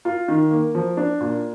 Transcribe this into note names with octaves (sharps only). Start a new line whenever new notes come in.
F4
D#3
A#3
F3
D4
A#2